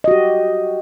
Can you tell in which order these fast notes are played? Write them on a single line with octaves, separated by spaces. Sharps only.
D#5 F#4 G4